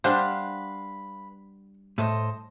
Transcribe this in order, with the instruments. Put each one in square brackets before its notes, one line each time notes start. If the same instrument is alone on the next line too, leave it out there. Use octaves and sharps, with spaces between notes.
[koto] G3 D4 [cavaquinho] B4 F5 [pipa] C5 F#5
[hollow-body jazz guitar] A2 [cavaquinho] A4 C5 D#5